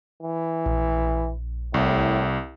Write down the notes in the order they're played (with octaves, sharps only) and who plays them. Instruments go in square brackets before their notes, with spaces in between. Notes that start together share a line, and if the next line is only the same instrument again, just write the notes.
[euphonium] E3
[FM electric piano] A#1
[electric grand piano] C2 [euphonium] A2